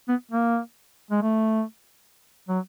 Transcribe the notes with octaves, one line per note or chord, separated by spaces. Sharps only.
B3
A#3
G#3
A3
F#3